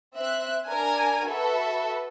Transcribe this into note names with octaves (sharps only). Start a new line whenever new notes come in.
C4 E5 F#6
D4 A#4 G#5
F#4 A4 B4 E5